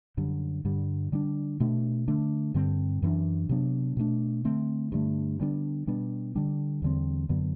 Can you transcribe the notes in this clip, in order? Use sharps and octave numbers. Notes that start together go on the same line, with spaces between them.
F#2 D3 G3
G2 D3 G3
D3 G3 D4
B2 A3 D4
D3 A3 D4
G2 D3 G3 C4
F#2 E3 B3 D4
C3 F#3 B3 D4
B2 A3 D4
D3 A3 C4
G2 D3 A3
D3 G3 B3 D4
B2 G3 B3 D4
D3 G3 D4
E2 D3 G3 C4
F#2 D3 F#3 B3